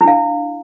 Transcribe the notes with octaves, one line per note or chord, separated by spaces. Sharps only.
D4 E4 F5